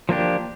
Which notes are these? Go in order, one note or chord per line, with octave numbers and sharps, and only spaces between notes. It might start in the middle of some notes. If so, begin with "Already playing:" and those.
F3 A#3 D4 G4